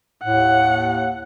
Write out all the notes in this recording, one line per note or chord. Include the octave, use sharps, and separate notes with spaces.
D#2 A2 F#5